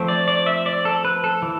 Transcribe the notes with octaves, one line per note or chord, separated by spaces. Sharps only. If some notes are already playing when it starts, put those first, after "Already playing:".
Already playing: F3 A3 C4
D5
D5
E5
D5
A4
B4
A4
E3